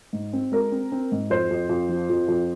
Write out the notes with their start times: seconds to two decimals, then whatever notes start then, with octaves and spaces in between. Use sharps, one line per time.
0.13 G#2
0.33 C4
0.52 G#3 A#4
0.72 C4
0.92 C4
1.12 G#2
1.30 F2 C5
1.51 F2
1.69 F2
1.89 F3
2.10 F2
2.28 F2